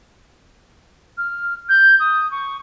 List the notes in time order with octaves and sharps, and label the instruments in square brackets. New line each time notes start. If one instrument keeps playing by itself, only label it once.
[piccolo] F6
G6
D#6
C#6